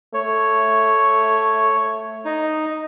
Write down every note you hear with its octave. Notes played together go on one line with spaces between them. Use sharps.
A3 C#5
D#4